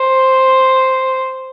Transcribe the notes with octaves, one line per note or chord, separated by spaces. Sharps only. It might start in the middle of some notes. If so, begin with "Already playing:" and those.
Already playing: C5